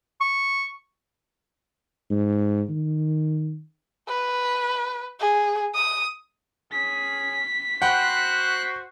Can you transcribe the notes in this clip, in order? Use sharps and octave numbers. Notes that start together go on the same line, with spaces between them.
C#6
G#2
D#3
B4
G#4
D#6
C#4 G#4 B6
F#4 C5 F#5 G5 B5 F#6